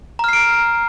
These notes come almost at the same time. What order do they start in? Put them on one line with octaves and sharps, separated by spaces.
A#5 F6 C7 D7